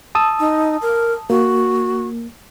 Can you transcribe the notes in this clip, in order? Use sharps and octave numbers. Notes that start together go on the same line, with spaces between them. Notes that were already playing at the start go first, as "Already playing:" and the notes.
A5 D#6 E6
D#4
A#4
A#3 F#4